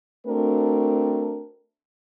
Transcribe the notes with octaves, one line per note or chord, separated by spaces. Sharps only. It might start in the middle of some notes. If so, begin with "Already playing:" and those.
A3 C4 D4 F#4 A#4